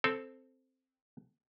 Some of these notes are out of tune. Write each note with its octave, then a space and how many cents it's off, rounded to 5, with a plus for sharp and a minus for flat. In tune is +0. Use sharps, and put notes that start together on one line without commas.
C4 +0 A4 +0